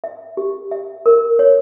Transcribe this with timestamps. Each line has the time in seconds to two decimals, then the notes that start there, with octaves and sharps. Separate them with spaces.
0.04 E5
0.37 G4
0.71 E5
1.06 A#4
1.39 C#5